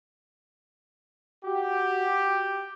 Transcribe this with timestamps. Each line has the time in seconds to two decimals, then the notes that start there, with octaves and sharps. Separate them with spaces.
1.45 F#4 G4